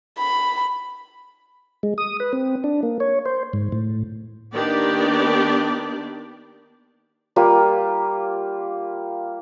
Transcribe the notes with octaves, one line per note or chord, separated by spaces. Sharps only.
B5
G#3
D#6
B4
C4
D4
A#3
C#5
C5
G#2
A2
D#3 A#3 B3 D4 G4 D5
G3 A#3 F4 G4